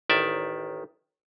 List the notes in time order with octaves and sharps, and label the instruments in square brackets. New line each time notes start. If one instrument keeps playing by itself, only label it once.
[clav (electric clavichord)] A1 D#3 D5 E5